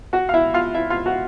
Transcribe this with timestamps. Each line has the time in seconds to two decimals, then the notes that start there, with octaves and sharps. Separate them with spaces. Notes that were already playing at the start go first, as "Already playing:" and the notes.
0.13 F#4 F#5
0.29 F5
0.34 E4 E5
0.54 F4 F5
0.74 E4 E5
0.90 F4 F5
1.06 F#4 F#5